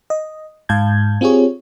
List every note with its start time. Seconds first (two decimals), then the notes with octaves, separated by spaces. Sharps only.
0.10 D#5
0.69 G#2 F5 A5 G6 G#6
1.21 C4 F4 G4 G#4 C#5